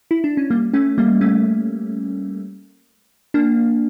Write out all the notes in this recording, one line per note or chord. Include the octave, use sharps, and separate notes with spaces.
E4
D4
C#4
G3 A#3
A3 C#4
G3 A#3
A3 C#4
A#3 D4